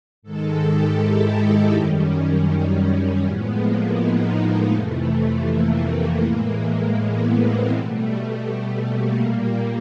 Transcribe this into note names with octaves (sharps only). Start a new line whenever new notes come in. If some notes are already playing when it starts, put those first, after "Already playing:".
G#2 D#3 G#3 A4
G4
E4
D#4
F#2 D#3 G3 C#4
C#4
A2 F3 G#3 B3
A#3
D#4
A#3
F2 C3 E3 A3
A3
A#3
A3
A2 E3 G#3 A#3
B3
C4
B2 G3 A3
A3
A#3
A#2 G3